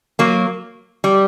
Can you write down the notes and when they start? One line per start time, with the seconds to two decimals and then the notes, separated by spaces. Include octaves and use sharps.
0.19 F#3 A#3
1.04 G3